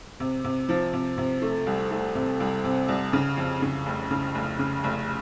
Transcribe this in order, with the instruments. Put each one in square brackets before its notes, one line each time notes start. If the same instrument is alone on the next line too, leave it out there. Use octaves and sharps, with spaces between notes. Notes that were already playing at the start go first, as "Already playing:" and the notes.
[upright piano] C3
C3
F3
C3
C3
A3
C2
A3
C3
C2
C3
C2
C#3
F2
C#3
F1
C#3
F1
C#3
F1